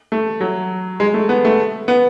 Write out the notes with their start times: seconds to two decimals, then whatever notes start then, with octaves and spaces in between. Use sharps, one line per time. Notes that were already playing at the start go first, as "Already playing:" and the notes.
0.12 A3
0.41 F#3
1.00 G#3
1.14 A3
1.29 B3
1.45 A3
1.88 B3